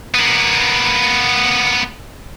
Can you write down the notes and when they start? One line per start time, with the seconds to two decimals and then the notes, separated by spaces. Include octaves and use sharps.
0.14 A#3 B3